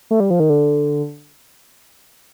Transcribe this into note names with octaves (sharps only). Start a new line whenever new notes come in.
A3
G3
F3
D#3
D3